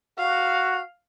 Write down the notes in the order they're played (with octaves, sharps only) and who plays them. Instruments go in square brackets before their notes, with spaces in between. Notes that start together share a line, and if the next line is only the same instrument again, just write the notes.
[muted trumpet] F#4 [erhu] F5